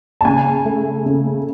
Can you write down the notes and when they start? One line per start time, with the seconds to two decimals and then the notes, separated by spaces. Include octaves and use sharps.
0.21 A5
0.25 C#3 G#5
0.65 A3
1.06 C#3